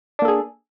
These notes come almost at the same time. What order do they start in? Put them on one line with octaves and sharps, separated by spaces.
D4 A#3 A4 G#4